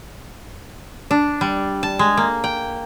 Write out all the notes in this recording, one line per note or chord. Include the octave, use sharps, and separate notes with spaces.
D4
G3
A5
G#3
A#3
G5